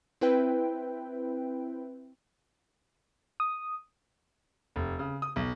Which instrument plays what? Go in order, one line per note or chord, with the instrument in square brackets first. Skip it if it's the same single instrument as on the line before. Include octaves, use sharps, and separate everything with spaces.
[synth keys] C4 E4 B4 G5
[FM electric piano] D#6
[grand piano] F1
C#3
D#6
B1